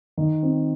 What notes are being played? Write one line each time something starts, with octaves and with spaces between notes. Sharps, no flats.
D#3
C4